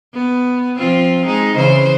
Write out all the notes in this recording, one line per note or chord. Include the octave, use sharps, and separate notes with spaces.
B3
F3 C4 F4
G#3 D#4
C#3 E3 C5